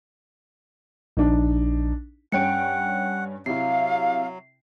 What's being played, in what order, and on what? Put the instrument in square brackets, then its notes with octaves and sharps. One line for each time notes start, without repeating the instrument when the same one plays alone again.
[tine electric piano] A#1 [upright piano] D4 D#4
[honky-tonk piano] G2 C#4 D7 [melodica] F#5 [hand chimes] G5 C#7
[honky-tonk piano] C3 E4 [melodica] F#3 [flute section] F5 [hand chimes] C7